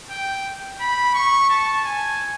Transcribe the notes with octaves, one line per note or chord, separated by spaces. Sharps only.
G5
B5
C#6
A5
G#5